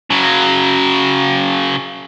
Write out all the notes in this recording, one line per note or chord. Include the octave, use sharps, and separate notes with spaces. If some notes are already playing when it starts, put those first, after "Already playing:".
C#3 F#3